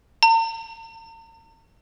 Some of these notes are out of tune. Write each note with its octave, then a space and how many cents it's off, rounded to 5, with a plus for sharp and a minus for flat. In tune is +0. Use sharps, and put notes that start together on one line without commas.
A#5 -45